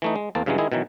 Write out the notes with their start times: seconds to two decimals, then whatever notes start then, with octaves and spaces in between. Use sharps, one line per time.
0.02 E3 A3 D#4
0.16 G#3
0.35 E2 A#3 C4 A5
0.46 G2 C#3 E3 F#3 G#3
0.58 D#3 G#3 E4 G#4
0.72 B2 D#3 E3 F#3